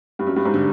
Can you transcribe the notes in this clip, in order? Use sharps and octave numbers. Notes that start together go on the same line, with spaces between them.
G2
F#2
G2
G#2
D3